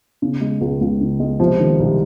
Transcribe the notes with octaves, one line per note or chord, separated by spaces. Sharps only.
C#3
G#3
C#2
C#2
C#3
G#3
C3 F3
D#3
C2